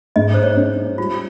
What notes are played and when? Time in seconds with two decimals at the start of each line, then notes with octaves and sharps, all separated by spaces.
0.16 G#2 D#5
0.34 C5
0.43 C#5
0.57 C#4
0.98 G3 F4